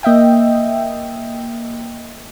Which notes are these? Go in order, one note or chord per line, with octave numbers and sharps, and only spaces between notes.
A#3 D#5 E5 G5